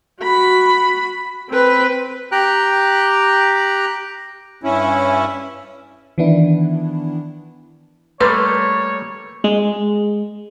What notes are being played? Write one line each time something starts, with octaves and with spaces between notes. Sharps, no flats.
F#4 B5
C4 B4
G4 G5 A#5 F#6
G2 C#4 E4
D#3 E3 B3 D4 E4
G3 A3 A#3 B4 C#5 C6
G#3